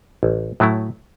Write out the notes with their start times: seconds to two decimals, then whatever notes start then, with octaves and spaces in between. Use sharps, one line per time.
0.23 A1
0.60 A2 F#3 A3 E4